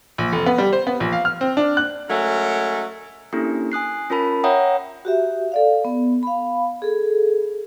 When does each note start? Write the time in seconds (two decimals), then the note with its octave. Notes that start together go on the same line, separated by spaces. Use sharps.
0.18 A#1
0.33 F1
0.46 B3
0.58 G3
0.73 C5
0.87 B3
1.00 A#1
1.12 F5
1.25 F6
1.41 C4
1.57 D4
1.77 F#6
2.10 F#3 G#3 A3 C#4 A#4
3.33 A#3 C#4 D4 E4 G4 A4
3.72 G#5 D#6 F#6 C7
4.10 C#4 F4 A#4 A5 B5
4.44 C#5 E5 F#5 G5 A#5 D#6
5.05 F#4 G4 E5
5.52 A4 D5 F5
5.85 B3
6.23 F5 B5
6.82 G#4 A4